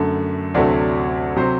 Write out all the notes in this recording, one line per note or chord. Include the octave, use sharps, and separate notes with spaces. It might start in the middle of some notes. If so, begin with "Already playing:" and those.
Already playing: F#2 D3 A3
D2 C3 F#3 A3 D5
C3 F#3 C5